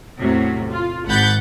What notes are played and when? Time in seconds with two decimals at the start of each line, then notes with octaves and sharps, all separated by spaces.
0.17 E2 A2 C3 F#3
0.70 F4
1.06 G#1 F#5 B5 G6 A6